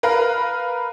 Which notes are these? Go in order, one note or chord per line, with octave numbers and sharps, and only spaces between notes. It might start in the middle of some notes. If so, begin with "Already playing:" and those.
A#4 B4 F5